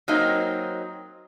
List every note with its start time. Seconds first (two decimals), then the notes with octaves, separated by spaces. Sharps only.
0.08 F#3 A#3 C4 D#4 D#5